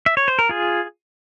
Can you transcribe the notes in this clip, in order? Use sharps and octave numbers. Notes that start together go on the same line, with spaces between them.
E5
C#5
C5
A#4
F4 G#4